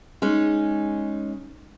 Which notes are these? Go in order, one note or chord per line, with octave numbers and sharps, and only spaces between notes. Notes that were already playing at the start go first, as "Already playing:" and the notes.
G#3 C#4 D#4